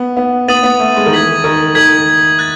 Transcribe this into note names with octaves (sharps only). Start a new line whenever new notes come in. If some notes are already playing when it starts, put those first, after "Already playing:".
Already playing: B3
B3
B3 D#6 A6 D#7 F#7
B3
A3
G#3
D#3
E3 G#6 B6 F#7
D#3
D#3 G#6 B6 F#7
F#6 A6